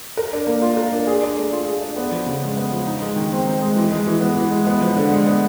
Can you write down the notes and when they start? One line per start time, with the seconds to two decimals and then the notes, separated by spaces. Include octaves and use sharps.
0.17 A#4
0.33 D4
0.47 A#3
0.62 F4
0.77 A#4
0.92 D4
1.07 G#4
1.23 D4
1.37 A3
1.52 F4
1.66 G#4
1.81 D4
1.96 B3
2.12 F3
2.26 C#3
2.42 G#3
2.57 B3
2.72 F3
2.86 D#4
3.02 G#3
3.16 D#3
3.32 C4
3.47 D#4
3.61 G#3
3.76 E3
3.92 G#3
4.07 E3
4.21 B3
4.37 E3
4.51 G#3
4.67 B3
4.81 F3
4.96 D3
5.11 G#3
5.27 B3